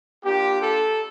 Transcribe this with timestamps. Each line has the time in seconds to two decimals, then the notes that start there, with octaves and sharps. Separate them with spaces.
0.24 A#3 D4 F4 G4
0.61 A4